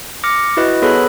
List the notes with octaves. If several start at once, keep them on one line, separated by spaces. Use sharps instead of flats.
D6 F6 A#6 C#7
E4 F#4 B4 D#5
B3 G#4 A4 B4 C#5 B5